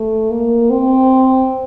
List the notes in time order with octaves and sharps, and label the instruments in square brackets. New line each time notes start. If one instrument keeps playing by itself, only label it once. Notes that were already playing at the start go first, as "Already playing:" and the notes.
Already playing: [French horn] A3
A#3
C4